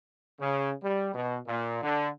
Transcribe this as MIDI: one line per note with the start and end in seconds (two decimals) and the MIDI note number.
0.40 0.71 49
0.83 1.09 55
1.14 1.38 47
1.47 1.81 46
1.82 2.08 50